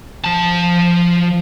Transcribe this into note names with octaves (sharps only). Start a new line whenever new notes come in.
F3 A5